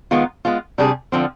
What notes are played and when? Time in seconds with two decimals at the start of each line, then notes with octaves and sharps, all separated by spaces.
0.11 D#3 G#3 B3 F4
0.45 G#3 B3 F4
0.78 C3 G3 D4 G#4
1.12 D3 F3 C4